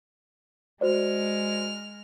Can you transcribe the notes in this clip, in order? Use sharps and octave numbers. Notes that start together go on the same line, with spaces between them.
G#3 F#4 C5 D5 F6